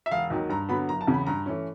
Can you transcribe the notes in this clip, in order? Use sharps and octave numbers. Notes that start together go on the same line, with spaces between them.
E5
E1 F5
D#2 D#3 F#3
G2 A#5
D3 F#3 B3 B5
F#1 A#5
A5
E2 C#3
B5
G2 A#5
E3 A3 C#4